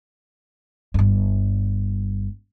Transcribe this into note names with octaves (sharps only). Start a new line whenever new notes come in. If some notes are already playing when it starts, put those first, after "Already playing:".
G1 G2